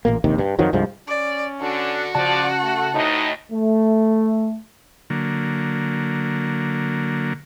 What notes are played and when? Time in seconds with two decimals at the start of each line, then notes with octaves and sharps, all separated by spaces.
0.05 A1 A#2 A#3
0.24 A#1 D#2 C3 D#3
0.38 G2
0.59 F2 D#3 F3 F#3
0.73 C2 G2 F3 G#3
1.08 C#4 D5
1.61 D3 D4 F#4
2.15 C#3 F3 D5 F#5 A5
2.62 A3
2.95 D2 A2 D#4 D#5
3.52 A3
5.10 D3 F#3 A#3